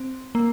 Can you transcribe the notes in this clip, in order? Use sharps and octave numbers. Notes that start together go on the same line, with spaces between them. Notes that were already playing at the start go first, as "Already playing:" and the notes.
Already playing: C4
A#3